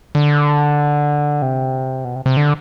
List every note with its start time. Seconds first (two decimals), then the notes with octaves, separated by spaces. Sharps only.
0.15 D3
1.42 C3
2.05 B2
2.15 C3
2.26 C3
2.37 D3